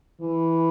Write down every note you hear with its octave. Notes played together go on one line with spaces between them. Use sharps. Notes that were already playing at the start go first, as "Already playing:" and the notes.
E3